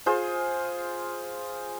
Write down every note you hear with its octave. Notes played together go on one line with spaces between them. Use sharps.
F4 G#4 C5